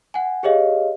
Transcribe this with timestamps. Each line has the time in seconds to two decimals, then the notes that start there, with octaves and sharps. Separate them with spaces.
0.14 F#5 G#5
0.43 G4 G#4 C#5 D#5 F5